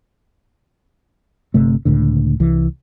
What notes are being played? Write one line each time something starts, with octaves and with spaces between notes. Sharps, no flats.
G1 C3 A3
C#2 A2 D3
C2 E3